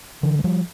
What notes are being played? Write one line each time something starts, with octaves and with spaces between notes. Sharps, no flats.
D3 E3
G#3
F3 G3